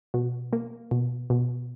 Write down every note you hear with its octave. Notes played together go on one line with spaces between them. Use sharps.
B2
A#3
B2
B2